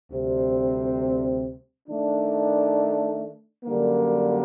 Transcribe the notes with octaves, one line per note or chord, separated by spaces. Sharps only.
D2 C3 G3 C4
D#3 A3 D4
F#2 D3 G3 A#3